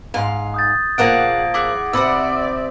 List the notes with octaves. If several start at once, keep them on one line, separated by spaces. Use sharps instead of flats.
G#2 F5 C6
D#6 G6 A6
A#2 F3 A#3 G#4 D5 F#5 A#6 D7
E4 G#4 F#5 D6
C3 C4 D5 E5 F#5 B5 E6